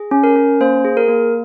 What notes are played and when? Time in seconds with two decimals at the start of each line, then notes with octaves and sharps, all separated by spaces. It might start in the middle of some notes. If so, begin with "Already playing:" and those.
Already playing: G#4
0.11 C#4
0.24 A#4
0.36 C#4
0.60 A#3 C5
0.85 G#4
0.97 A#4
1.08 A#3